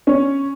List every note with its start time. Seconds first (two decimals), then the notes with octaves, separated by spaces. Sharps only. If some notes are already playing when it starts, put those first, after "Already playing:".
0.07 C#4